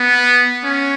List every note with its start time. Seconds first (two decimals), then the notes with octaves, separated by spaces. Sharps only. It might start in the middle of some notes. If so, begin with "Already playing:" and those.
Already playing: B3
0.64 C#4